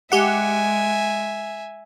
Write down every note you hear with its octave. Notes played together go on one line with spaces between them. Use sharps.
G#3 G4 E5 F#5 G#5